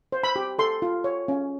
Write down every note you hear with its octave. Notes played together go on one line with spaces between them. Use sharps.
C5
B5
G4
A4 C6
F4
C#5
C#4